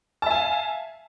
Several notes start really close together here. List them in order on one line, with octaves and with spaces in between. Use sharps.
A5 E5 G#5 F5